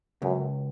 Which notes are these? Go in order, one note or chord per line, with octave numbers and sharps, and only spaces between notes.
C#2 F#2